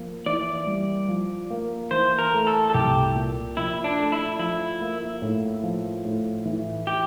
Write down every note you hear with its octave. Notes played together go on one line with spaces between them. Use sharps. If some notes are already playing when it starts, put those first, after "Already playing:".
Already playing: F3 A#3
E3 D5
G3
F3
A#3
E3 C5
A#4
A3
A4
A4
C2 G4
A#2
F3 E4
D4
A3
E4
F3 E4
A#3
A2
F3
A2
E3
G4